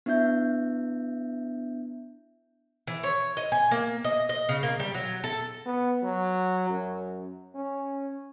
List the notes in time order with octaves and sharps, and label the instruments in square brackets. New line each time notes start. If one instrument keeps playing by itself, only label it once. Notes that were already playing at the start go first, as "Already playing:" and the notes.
[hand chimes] B3 D4 E4 E5 G6
[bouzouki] E3
C#5
D#5
G#5
A#3
D#5
D#5
C#3
A#3
G3
F#3
A4
[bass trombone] B3
F#3
F#2
C#4